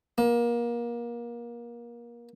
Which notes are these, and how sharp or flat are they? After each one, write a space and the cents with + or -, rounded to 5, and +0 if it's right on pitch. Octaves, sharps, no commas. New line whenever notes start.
A#3 +30